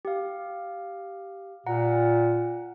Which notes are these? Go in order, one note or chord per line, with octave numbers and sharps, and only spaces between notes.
G4 F5
A#2 F#5 A#5